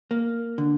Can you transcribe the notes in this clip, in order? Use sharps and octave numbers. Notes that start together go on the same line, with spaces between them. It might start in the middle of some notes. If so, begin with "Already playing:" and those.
A#3
D3